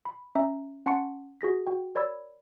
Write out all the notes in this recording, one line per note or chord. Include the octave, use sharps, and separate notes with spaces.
B5
C#4 E5 A#5
C#4 F#5 A5 C6 C#6 C#7
F#4 G#4 A#6 B6
F#4 G5
A#4 C#5 D5 B5 E6 G#6